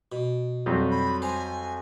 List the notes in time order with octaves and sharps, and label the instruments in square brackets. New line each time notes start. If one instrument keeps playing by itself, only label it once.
[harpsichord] B2
[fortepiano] F2 F#3 G3
[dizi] B5
[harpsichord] C5 A#5 [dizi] G#5